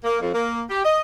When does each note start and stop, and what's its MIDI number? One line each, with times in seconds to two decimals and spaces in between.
0.04 0.21 58
0.21 0.29 41
0.33 0.63 58
0.69 0.79 67
0.85 1.00 75